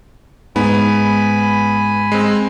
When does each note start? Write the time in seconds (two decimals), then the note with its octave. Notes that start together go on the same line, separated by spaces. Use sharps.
0.56 G#2 B3 G#5 B5
2.12 G#3 C4